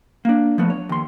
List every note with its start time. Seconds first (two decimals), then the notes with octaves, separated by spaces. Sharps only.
0.25 A#3 D4
0.58 F3 A3 B3
0.70 C#5
0.89 D#2 C6